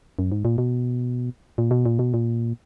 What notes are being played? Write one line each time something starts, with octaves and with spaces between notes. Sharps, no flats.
F#2
G#2
A#2
B2
A#2
B2
A#2
B2
A#2